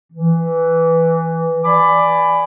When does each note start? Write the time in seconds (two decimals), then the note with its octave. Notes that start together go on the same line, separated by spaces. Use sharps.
0.13 E3
1.64 D5 G#5 B5 D6